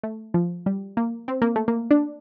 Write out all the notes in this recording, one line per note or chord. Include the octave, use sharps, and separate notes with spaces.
A3
F3
G3
A#3
C4
A#3
A3
A#3
D4